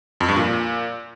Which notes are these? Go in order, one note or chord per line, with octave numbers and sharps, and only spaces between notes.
F2
G2
A#2